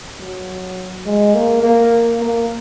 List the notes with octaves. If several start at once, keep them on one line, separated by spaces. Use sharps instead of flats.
F#3
G#3
A#3
A#3
A#3